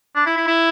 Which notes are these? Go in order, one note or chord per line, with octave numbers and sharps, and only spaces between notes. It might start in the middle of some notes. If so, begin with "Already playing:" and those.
D4
E4
E4
E4